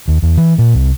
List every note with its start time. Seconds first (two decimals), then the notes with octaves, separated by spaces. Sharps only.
0.08 D#2
0.22 E2
0.37 E3
0.58 A#2
0.75 C2